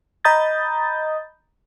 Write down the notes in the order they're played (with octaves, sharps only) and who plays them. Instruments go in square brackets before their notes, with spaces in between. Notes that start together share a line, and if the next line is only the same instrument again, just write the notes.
[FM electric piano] D#5 A#5 B5 D#6 G6 A6